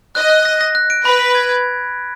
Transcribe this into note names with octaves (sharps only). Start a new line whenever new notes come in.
D#5 F#6
F#6
A#6
A#6
F#6
D7
B4 B5
B6
G#6
G#6